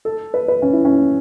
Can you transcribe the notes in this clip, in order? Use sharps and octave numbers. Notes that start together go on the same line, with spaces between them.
A4
B4
B4
C#4
E4
C#4